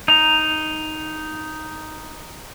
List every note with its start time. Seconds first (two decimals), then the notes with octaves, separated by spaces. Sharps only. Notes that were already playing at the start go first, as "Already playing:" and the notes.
0.08 D#4 A#5